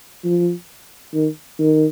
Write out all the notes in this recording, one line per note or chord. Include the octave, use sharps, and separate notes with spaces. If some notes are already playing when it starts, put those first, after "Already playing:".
F3
D#3
D#3